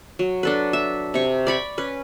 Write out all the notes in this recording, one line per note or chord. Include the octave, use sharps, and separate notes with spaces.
F#3
D4 A4 B4
E5
C3 C#6
D5 B5 C#6
C#4 B4